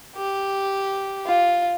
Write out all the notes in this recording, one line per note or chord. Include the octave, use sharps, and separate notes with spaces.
G4
F4